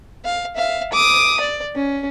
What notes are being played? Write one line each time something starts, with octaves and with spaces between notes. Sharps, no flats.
F5
E5 F5
D6 D#6
D5
C#4